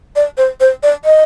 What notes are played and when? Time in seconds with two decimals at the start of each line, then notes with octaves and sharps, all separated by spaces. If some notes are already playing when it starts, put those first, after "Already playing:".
0.16 D5
0.37 C5
0.60 C5
0.83 D5
1.05 D#5